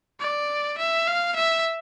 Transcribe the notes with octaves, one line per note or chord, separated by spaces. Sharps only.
D5
E5
F5
E5